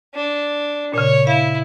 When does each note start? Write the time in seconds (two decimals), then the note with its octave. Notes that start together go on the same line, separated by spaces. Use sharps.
0.15 D4
0.94 A#2 C#3 C#5
1.27 E4 F5